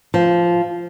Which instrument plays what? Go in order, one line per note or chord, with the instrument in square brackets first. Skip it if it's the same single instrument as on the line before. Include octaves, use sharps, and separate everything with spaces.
[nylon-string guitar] F3